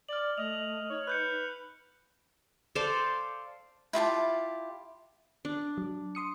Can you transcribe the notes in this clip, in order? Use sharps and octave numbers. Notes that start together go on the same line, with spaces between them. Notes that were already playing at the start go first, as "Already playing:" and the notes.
D5 F6 F#7
A3 D#5 F7
D#4 C#5
B4 F#6 G6 C#7
A4 C5 D5 F5
E4 F4 G4 A5
D4
F#3
C6 D#6 C#7